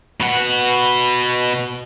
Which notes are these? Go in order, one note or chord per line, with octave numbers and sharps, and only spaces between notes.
B2 F#5